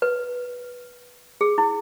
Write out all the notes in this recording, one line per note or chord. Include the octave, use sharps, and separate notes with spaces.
B4
G#4
E4